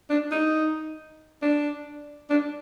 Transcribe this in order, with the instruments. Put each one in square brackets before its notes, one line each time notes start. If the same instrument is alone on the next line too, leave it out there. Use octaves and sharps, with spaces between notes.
[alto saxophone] D4
D#4
D4
D4